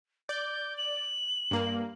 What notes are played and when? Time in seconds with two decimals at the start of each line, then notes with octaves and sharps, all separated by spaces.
0.29 D5 G6
0.78 F#7
1.51 G2 A#3